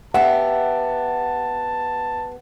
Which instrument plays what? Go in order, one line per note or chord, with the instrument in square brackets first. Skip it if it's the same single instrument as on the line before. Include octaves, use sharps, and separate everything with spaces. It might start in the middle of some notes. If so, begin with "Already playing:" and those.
[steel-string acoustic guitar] B3 G4 [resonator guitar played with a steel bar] E5 [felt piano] F#5 [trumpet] A5